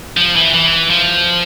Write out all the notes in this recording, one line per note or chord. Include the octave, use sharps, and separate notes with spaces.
F3
E3
E3
F3